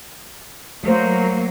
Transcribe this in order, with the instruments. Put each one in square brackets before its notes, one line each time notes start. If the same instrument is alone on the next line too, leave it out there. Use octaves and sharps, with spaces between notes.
[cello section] F#3 A#3 [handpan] A3 C5